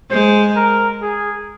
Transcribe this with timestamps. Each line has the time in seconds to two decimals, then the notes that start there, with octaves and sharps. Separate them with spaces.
0.11 G#3 C5
0.56 A#4
1.02 G#4